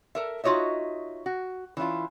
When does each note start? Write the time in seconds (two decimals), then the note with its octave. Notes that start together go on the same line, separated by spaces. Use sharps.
0.15 A4 A#4 E5
0.44 D#4 F4 F#4 C#5 D#5 E5
1.26 F#4
1.77 E3 C#4 E4 F4